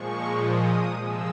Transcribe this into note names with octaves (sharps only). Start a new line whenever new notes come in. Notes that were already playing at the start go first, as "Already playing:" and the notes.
Already playing: A#2 F3 G#3 C#6
D#6
C3 F3 G#3 E6